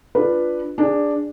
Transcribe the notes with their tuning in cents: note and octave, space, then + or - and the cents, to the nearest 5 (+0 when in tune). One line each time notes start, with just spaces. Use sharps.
D4 +5 F4 +0 B4 +0
D4 +0 G#4 -20